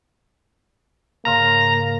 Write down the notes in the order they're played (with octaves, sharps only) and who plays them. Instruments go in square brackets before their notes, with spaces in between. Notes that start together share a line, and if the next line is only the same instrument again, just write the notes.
[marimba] G#2 C#3 F5 [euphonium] A#3 [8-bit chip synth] A#5